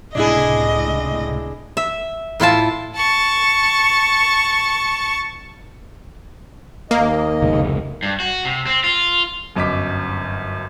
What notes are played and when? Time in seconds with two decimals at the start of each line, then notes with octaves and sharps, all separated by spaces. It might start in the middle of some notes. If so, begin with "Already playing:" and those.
0.15 C#2 A2 C3 D4 E4 G#4 D#5
1.77 E5
2.40 A2 E4 F4 A5
2.96 A5 C#6
6.91 D#2 A#3 D#5
7.42 F1 C#2 G#2
8.03 G2
8.20 F#4
8.45 C3
8.67 C4
8.84 F4
9.55 G1 F#2 D#5 D6 B6